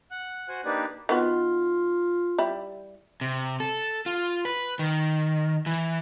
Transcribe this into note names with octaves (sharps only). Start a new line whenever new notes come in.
F#5 F#6
F#4 C5 F#5 G#5
A#3 D4 D#4 G4 B4 D5
D#3 B3 F4 F#4
G3 E4
C3
A4
F4
B4
D#3
E3